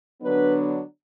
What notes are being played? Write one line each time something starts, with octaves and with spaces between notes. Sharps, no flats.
D3 F#3 B3 D4 B4